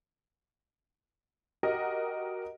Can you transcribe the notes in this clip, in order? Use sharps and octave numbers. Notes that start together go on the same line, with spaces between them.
F#4 G4 A#4 D#5 F#5